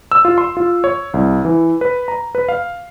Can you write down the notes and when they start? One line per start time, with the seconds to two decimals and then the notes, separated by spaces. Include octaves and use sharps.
0.12 E6
0.25 F4
0.38 C6
0.57 F4
0.84 C#5
1.14 C2
1.45 E3
1.81 B4
2.08 A#5
2.35 B4
2.49 F5